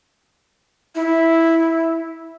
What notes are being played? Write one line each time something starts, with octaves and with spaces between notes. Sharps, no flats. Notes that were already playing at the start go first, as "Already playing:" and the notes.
E4